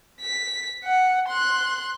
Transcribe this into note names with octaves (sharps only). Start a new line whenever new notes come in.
B6
F#5
C6 F#6